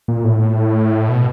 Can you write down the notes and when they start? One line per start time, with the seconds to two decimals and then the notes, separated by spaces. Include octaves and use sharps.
0.08 A#2
0.24 A2
1.09 B2